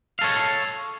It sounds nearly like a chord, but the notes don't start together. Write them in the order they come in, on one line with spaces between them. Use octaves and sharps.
F5 A4 C#5